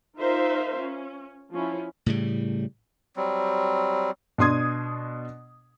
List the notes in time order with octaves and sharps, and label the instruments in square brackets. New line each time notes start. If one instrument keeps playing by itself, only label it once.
[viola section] D#4 F4 A#4 C5 E5 F5
C#4
F3 C#4 E4
[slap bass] A2 C#3 G3
[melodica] F#3 G3 C4
[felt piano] B2 D4 C6 D#6 G#6